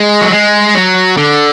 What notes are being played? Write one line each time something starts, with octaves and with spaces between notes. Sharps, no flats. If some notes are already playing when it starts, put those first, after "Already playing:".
Already playing: G#3
F#3
G#3
F#3
D3